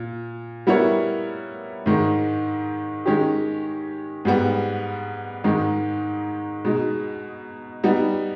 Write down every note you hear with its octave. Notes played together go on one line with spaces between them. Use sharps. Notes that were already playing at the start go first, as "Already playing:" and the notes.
Already playing: A#2
G3 B3 E4 A#4 C#5
G#2 D#3 G#3
D#3 G#3 C#4 G4
G#2 G3 B3
G#2 D#3 G#3 D#4
B2 G#3 D#4
G3 B3 D#4